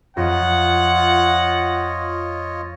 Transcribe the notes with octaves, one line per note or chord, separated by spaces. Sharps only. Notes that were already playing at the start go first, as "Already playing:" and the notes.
F2 F4 C#5 D#5 F#5